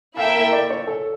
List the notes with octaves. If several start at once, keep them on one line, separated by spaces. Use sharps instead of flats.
A#3 E4 A4 E5 F5 G5
F5
D5
C#5
A4